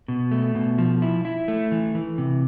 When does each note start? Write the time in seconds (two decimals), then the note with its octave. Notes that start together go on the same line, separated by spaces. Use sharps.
0.08 B2
0.32 A3
0.55 B2
0.78 F3
1.02 E4
1.25 E4
1.48 A3
1.72 E3
1.95 E3
2.18 C3